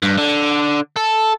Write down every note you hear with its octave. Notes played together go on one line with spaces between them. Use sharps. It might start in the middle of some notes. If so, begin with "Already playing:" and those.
G2
D3
A4